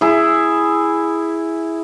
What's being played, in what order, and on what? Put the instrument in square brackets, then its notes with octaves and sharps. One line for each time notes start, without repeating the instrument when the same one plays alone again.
[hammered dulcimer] E4 G#4